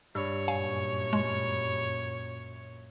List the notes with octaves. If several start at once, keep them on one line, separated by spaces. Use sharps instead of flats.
G2 C#5 E6
F#2 A#2 F5 G#5
G#3